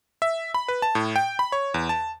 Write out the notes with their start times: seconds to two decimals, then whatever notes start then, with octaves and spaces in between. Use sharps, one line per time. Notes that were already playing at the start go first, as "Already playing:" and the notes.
0.22 E5
0.54 B5
0.68 B4
0.82 A5
0.95 A2
1.16 G5
1.39 B5
1.52 C#5
1.74 E2
1.89 A5